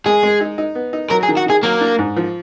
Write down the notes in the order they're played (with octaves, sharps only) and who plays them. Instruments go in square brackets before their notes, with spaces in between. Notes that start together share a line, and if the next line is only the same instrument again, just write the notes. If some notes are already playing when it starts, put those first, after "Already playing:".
[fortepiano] G#3 [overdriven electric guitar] G#4
[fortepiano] G#3
D#4
D#4
B3
D#4
[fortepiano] F#3 [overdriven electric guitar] A#4
[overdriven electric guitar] G#4
[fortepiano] D#3
[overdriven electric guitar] F#4
[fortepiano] D#3 [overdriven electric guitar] G#4
[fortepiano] F#3 [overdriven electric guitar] A#3
[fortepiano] D4
G#2
F3